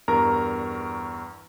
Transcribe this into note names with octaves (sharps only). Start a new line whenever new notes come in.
E2 G2 A#4 A#5